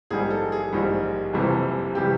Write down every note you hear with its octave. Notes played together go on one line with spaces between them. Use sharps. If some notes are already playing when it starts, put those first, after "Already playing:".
A#1 G#2 D#3 G3 G#4
A4
G#4
A#1 G#2 D#3 G3
F#1 F2 C3 E3 G3
C3 E3 G3 G4